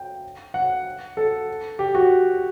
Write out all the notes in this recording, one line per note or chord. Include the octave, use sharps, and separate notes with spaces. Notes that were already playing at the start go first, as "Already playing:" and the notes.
Already playing: G5
F#5
A4
G4
F#4